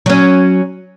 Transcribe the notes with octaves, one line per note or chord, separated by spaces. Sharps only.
F#3 C#4